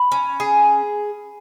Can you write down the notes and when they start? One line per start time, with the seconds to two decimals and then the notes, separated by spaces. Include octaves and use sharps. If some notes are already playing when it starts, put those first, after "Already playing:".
Already playing: B5
0.12 C#4
0.40 G#4